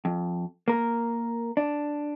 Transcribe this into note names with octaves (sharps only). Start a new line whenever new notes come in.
F2
A#3 A#4
D4